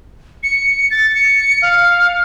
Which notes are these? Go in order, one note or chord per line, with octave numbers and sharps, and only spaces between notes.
C#7
A6
C#7
F5